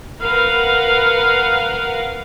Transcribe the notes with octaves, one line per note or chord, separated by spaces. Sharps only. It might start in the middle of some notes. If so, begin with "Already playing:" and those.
A#4 B4 F5 F#5